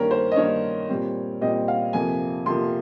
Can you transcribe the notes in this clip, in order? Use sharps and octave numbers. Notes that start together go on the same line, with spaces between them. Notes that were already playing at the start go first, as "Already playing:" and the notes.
Already playing: G2 D#3 A#3 C#4 A#4
C5
D#5
G2 D#3 A#3 C#4 C#5
A#2 G3 C4
A#2 G3 C4 D#5
F5
F2 C3 F3 A#3 G#5
F2 C3 F3 A#3 C6